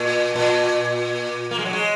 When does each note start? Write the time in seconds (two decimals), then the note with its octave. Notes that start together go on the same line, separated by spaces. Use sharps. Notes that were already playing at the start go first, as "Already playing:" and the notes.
Already playing: A#2
0.36 A#2
1.51 A#3
1.59 G#3
1.65 F#3
1.73 G#3